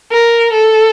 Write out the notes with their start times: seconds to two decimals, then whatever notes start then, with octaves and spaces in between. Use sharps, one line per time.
0.11 A#4
0.53 A4